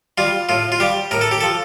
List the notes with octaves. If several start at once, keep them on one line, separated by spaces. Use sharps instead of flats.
G3 F4
A2 F4
F4
G3 G4
A2 A#4
A4
G4
F3 A4